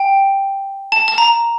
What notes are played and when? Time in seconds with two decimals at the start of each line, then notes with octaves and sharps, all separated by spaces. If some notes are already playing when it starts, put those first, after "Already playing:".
Already playing: G5
0.92 A5
1.08 A5
1.18 A#5